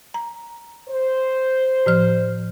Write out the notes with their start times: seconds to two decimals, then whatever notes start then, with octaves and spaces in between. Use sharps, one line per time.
0.14 A#5
0.89 C5
1.86 A2 F3 F6